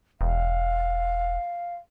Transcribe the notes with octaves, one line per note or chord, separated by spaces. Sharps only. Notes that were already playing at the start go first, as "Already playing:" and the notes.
E1 F5